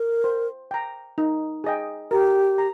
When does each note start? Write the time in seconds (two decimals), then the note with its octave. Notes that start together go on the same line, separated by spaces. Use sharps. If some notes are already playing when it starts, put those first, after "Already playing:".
Already playing: A#4
0.24 C5
0.71 G5 A#5
1.18 D#4
1.64 G#4 D#5 G5
2.11 G4 A#4
2.58 A#5